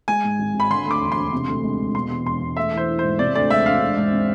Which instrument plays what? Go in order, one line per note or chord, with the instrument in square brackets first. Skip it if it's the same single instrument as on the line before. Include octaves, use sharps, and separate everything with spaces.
[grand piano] G#3 [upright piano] G#5
[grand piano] G#2
G#1
G#1
[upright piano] B5
[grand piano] D3 [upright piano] C6
[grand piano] D2
[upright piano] D6
[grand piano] E1
[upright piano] C6
[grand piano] E1
C3
D2
G#3
E1
[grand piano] B2 [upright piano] C6
[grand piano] E2
[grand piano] E1 [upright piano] C6
[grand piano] E1
[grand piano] A3 [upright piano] E5
[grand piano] E3 [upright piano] C5
[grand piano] E4
[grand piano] G#2 [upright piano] C5
[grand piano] C3 [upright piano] D5
[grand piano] D2 [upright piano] D5
[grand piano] G#3 [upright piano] E5
[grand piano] E1 [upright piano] F5
[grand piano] G#3
G#2
C4